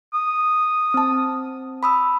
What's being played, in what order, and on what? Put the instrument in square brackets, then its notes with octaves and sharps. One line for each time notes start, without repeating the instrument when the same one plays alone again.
[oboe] D#6
[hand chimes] C4 A5
B5 D#6 E6